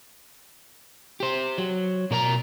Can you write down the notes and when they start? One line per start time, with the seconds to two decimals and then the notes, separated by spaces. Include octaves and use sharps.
1.20 G4 C5
1.58 F#3
2.11 B2 A#4 C#5 A#5